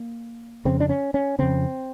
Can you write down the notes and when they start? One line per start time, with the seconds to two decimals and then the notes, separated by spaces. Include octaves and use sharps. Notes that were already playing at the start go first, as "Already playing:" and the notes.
Already playing: A#3
0.65 F2 C#3 C4
0.80 D4
0.89 C#4
1.14 C#4
1.39 F2 C#3 C4